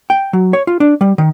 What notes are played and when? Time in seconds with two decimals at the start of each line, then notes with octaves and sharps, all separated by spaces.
0.10 G5
0.33 F#3
0.53 C#5
0.67 F4
0.80 D4
1.01 G3
1.18 D#3